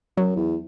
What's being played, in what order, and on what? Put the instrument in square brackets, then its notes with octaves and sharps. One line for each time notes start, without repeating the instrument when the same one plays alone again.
[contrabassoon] F#2 [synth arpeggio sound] F#3
[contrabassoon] E2